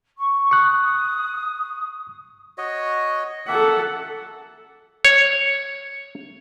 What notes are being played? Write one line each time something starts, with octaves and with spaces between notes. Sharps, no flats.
C#6
C#6 D#6 F#6
F#4 C#5 D#5
A#3 A4 E5 F#5
C#5